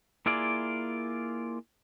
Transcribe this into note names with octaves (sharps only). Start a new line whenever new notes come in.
A#3 E4 F4 G#4 D5